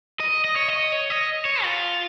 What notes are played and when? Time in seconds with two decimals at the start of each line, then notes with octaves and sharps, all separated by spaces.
0.20 D#5
0.44 D#5
0.56 C#5
0.68 D#5
0.92 C#5
1.10 D#5
1.45 C#5
1.63 F4